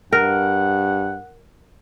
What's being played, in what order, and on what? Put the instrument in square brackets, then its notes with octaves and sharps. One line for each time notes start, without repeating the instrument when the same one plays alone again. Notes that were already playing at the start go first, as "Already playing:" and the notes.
[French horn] G2 [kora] A#4 [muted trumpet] F#5